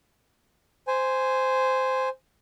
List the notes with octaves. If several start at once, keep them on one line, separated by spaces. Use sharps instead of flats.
C5 G#5